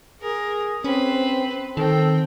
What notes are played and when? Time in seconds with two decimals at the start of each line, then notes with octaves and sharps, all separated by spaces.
0.22 G#4 A#4
0.84 C4 C#4 B4 C5
1.77 D#3 C4 A4 G5